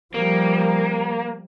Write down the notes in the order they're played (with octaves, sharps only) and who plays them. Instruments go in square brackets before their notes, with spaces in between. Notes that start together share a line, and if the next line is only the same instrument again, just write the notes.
[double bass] F3 G3 [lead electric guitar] A#3